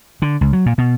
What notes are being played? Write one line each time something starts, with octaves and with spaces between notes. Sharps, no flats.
D3
C#2
F#3
A#2
B2